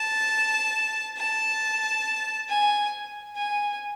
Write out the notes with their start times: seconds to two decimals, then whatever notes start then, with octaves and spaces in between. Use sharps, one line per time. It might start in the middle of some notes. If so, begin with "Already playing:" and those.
Already playing: A5
1.17 A5
2.49 G#5
3.36 G#5